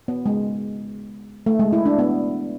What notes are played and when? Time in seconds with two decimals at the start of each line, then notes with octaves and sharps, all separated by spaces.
0.08 B3
0.26 G#3
1.46 A3
1.59 G#3
1.73 E4
1.86 D4
1.99 B3